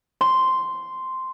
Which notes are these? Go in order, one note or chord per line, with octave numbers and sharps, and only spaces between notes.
C6